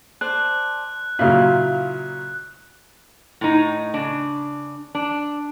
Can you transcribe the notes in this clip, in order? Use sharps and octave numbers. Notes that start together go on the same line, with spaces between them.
C5 D5 A5 F#6
A#2 C#3 F#3 E4 F4 F5
A2 D#4
C#3 D4
D4